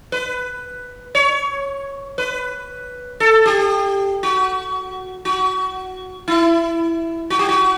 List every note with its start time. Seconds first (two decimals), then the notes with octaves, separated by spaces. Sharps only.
0.12 B4
1.15 C#5
2.18 B4
3.20 A4
3.46 G4
4.23 F#4
5.25 F#4
6.28 E4
7.30 F#4
7.39 G4
7.49 F#4